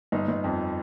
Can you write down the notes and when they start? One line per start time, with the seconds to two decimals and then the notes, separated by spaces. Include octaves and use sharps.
0.12 G1 D#4
0.28 G1
0.44 F2